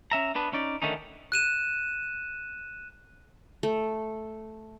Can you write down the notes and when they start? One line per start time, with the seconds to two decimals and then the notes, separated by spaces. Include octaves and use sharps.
0.11 C#4 E5 A#5
0.35 B3 D4 B4
0.53 C#4 D#4 D5
0.82 D3 D#3 A3 C#4 D#4
1.32 F#6 D#7 E7
3.63 A3